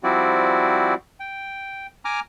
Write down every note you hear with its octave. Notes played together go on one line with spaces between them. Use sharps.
F3 G3 C4 E4 F#4 D5
G5
G#5 A#5 D6 F6